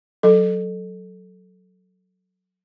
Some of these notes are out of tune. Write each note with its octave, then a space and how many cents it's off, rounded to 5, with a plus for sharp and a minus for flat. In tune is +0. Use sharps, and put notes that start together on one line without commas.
F#3 +0 A4 +0